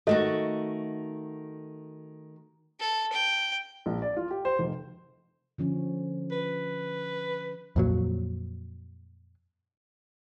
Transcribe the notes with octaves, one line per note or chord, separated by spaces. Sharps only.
D#3 A3 F#4 A4 D#5
A4
G5
A#1
D5
F4
G4
C5
F1
D3 F3 C#4
B4
F2 A#2 F#3